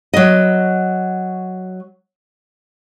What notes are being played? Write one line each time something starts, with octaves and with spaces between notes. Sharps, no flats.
F#3 D#5